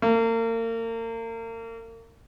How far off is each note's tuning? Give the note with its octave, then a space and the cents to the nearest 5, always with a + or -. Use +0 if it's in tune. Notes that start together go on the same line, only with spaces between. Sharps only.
A#3 -35